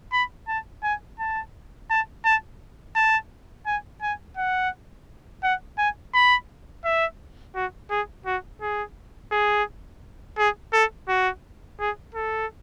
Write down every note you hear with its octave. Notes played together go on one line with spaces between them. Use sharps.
B5
A5
G#5
A5
A5
A5
A5
G#5
G#5
F#5
F#5
G#5
B5
E5
F#4
G#4
F#4
G#4
G#4
G#4
A4
F#4
G#4
A4